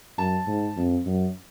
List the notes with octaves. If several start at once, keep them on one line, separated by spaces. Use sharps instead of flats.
F#2 A5
G#2
F2
F#2